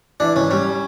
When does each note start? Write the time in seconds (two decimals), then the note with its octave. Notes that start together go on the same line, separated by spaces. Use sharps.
0.20 E3 D4
0.36 G#1 C#4
0.51 G3 C#4